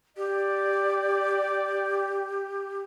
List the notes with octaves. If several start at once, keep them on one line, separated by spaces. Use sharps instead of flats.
G4 D5